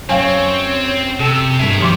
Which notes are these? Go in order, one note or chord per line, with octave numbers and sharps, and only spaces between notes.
F#2 C4 C#5 F5 G5 G#5
C3 A4
G2 B2 G#4 A#4 E5
D#3 F3 G3 C6 D6